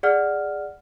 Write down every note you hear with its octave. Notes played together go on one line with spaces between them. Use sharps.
G#4 D5 F#5 F6